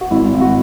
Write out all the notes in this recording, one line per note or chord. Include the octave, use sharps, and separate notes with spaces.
F#4
G#1 E4
G#1
F#4